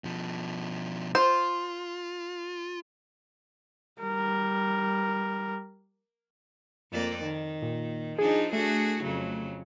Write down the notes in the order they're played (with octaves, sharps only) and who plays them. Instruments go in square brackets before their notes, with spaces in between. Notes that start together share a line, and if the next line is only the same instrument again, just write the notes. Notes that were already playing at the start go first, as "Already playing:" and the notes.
[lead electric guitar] B2 F3
[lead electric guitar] F4 [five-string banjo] C5
[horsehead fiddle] G3 A#4
[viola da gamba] F2 A#3 D5
D#3
[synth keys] A#2
[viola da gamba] F3 D4 D#4 [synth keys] G#4
[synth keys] A3 [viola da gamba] D4 F#4 G#4
[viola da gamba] F2 C#3 F#3